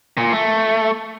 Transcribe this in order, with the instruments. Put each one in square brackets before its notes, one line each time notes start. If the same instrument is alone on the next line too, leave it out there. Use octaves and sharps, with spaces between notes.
[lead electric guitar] A#2
A3